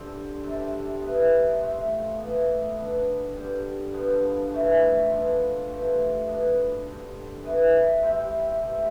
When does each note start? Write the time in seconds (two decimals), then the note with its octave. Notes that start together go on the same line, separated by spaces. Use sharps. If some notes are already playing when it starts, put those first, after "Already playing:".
Already playing: D3 G3 C4
0.44 C3 G3 D4 A4
1.01 B3 E4 B4
1.60 A3 C4 F4 C5
2.18 A2 E3 B3
2.77 B3 D4 A4
3.34 G2 D3 G3
3.93 G2 D3 F3 B3
4.52 E3 A3 E4
5.10 B3 D4 F4 A4
5.68 E3 A3 C4 G4
6.27 B2 B3 D4
6.85 D3 G3 C4
7.43 E3 B3 E4 B4
8.02 C3 G3 C4 E4
8.60 A2 G3 C4